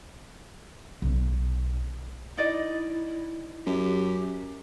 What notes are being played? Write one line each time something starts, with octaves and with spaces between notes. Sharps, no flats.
B1 D#3
D#4 E4 D5 D#5
F#2 G4